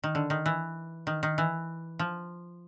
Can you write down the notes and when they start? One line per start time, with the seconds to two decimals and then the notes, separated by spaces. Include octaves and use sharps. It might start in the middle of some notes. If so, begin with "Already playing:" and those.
0.04 D#3
0.15 D3
0.30 D#3
0.46 E3
1.07 D#3
1.23 D#3
1.38 E3
1.99 F3